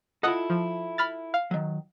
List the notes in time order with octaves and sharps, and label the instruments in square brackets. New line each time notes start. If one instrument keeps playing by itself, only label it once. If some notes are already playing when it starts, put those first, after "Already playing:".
[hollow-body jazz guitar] E4 F4 A4 [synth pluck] D#5 F#5 D#6
[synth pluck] F3
B5 F6 A6
F5
[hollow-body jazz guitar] D#3 F#3